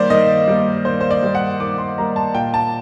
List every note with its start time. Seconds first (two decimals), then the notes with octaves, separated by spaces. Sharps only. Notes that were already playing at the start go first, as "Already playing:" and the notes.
Already playing: D#3 G3 A#3 C5 D5
0.10 D#3 D#5
0.48 G3 A#3
0.85 D#3 C5
1.00 C5
1.11 D5
1.23 G3 A#3
1.35 F#5
1.60 D#3 D6
1.78 C6
1.98 G3 A#3 A#5
2.16 A5
2.35 A#2 G5
2.54 A5